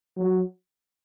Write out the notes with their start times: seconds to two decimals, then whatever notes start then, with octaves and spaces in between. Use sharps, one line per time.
0.17 F#3